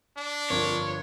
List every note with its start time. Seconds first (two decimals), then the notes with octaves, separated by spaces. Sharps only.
0.17 D4
0.50 G1 F2 C4 A#4 C#5